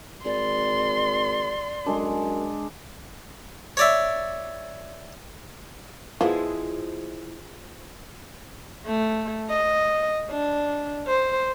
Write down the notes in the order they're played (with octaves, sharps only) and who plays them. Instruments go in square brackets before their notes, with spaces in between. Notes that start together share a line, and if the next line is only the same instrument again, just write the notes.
[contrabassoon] G#1 [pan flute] D5 [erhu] C6
[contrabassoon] F#2 [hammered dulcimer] G#3 D4
[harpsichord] C#5 D5 E5
[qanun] F3 G#3 [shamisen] B3 F4 [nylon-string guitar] E4 G#4
[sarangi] A3
D#5
D4
C5